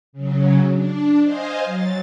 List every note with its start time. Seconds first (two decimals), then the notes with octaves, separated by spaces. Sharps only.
0.13 C#3 F#3
0.72 D4
1.22 C5 D#5 F5 G#5
1.65 F#3 A6